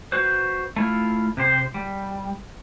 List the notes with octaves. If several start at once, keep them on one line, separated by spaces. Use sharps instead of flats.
F#4 B4 C5
A3 E4 F4
C3 G4 C5
G3